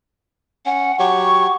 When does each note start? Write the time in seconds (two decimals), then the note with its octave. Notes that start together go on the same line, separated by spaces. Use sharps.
0.66 C#4 F#5
0.99 F#3 G4 C#5 C#6